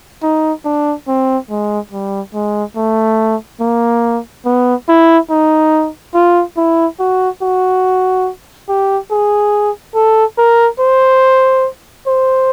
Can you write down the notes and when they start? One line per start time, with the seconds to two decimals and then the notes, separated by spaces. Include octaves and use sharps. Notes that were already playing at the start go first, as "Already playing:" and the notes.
0.23 D#4
0.65 D4
1.08 C4
1.50 G#3
1.92 G3
2.34 G#3
2.76 A3
3.60 A#3
4.45 B3
4.89 E4
5.31 D#4
6.14 F4
6.57 E4
7.00 F#4
7.42 F#4
8.69 G4
9.11 G#4
9.95 A4
10.38 A#4
10.80 C5
12.07 C5